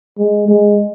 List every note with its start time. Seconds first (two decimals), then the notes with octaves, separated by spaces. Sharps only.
0.18 G#3
0.48 G#3